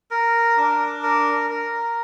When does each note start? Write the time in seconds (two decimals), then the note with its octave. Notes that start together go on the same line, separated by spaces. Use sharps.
0.11 A#4
0.57 D4
1.03 A#4
1.50 A#4